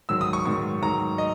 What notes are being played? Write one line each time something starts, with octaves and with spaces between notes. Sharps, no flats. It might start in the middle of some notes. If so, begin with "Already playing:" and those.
G#2 D#3 F#3 E6
D#6
C#6
G#2 D#3 F#3 C#6
G#2 D#3 F#3 A#5
D#5